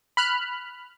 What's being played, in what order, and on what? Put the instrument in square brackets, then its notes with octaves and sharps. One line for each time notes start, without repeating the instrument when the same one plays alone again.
[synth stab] B5 F6 F#6